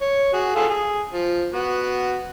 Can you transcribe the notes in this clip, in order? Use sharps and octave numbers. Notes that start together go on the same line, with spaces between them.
C#5
F#4 G#4
F4 G#4 A4
G#4
F3
B3 F#4